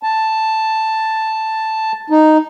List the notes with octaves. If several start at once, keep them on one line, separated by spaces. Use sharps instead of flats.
A5
D#4